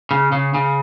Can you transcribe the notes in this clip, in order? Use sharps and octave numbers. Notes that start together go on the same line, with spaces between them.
C#3
C#3
C#3